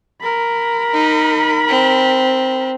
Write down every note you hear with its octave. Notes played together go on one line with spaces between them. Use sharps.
A#4 B5
D#4
C4